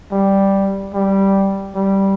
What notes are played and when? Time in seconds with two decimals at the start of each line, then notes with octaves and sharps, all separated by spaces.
0.11 G3
0.93 G3
1.76 G3